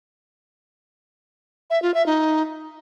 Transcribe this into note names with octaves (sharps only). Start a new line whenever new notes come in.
E5
F4
E5
D#4